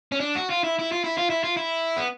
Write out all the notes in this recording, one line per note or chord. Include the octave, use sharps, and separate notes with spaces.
C#4
D4
F#4
F4
E4
E4
F4
E4
F4
E4
F4
E4
B3